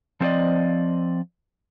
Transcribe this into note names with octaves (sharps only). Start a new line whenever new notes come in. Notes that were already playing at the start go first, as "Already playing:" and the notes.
F3 C4 A4 A#4 D5 D#5